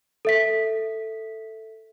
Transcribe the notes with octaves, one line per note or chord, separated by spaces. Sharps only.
A4 E5 B6